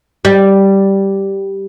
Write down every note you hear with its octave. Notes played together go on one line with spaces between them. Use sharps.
G3